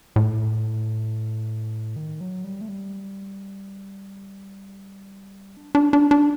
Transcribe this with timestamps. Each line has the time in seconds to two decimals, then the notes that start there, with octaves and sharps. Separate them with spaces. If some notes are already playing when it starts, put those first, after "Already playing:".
0.16 A2
1.96 D#3
2.21 F#3
2.44 G3
2.61 A3
2.68 G3
5.57 D4
5.75 D4
5.93 D4
6.11 D4